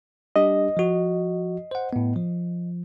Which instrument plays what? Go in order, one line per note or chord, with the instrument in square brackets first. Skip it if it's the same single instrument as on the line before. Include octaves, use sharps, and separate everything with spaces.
[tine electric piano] G3 D4 G4 [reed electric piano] D#5
[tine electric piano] F3 F#4
C5 F#5
A2 B3
F3